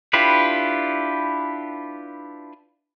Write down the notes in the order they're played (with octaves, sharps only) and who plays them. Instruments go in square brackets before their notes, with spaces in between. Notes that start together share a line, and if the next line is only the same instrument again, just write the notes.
[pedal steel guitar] D4 E4 F4 G4 B4